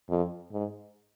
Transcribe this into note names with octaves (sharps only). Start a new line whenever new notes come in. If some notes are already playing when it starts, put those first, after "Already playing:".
F2
G#2